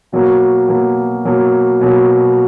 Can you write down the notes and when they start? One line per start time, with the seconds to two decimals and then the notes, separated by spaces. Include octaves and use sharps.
0.12 B2 F#3 A#3
0.68 B2 F#3 A#3
1.25 B2 F#3 A#3
1.81 B2 F#3 A#3